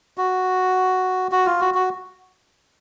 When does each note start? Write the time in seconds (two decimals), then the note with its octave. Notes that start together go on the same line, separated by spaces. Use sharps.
0.18 F#4
1.32 F#4
1.46 F4
1.61 F#4
1.74 F#4